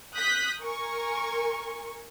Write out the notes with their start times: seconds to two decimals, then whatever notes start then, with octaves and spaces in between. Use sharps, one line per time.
0.16 D#6 F#6 G6 B6
0.61 A#4 G#5 C#6